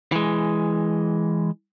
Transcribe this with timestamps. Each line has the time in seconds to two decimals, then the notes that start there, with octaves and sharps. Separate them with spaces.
0.12 E3 G#3